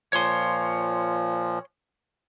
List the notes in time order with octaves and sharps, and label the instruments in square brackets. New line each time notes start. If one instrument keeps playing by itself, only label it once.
[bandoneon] A#2 F3 [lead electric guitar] C#5 C6